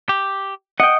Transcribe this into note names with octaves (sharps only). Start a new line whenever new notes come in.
G4
D#5 F#5 G5